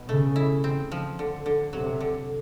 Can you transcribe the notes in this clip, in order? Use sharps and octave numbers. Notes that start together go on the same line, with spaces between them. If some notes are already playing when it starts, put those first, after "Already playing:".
Already playing: B2
C#3 A3
E4
C4
F3
D3
D3
C3 F#3
D3